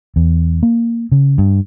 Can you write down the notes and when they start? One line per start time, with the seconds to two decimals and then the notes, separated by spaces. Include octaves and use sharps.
0.16 E2
0.63 A#3
1.12 C#3
1.38 G2